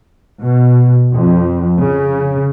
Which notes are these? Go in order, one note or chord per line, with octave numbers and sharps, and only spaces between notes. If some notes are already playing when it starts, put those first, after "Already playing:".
B2
F2
C#3